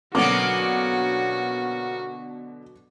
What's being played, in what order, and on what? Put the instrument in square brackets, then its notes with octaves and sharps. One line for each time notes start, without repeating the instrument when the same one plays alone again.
[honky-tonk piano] B2 D3 [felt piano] F#3 D6 [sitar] A#3 B3 C#4 [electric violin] F#4